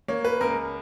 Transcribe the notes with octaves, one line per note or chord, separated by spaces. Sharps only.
A#3 C#5
B4
C#2 A#4